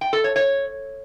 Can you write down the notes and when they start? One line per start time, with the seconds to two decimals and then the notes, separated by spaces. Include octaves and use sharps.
0.01 G5
0.13 A4
0.24 C#5
0.36 C#5